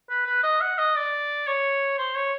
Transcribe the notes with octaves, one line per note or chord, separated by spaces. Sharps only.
B4
B4
D#5
F#5
D#5
D5
C#5
C5
C#5